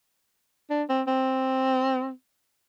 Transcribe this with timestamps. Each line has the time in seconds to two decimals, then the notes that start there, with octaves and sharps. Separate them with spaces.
0.70 D4
0.89 C4
1.07 C4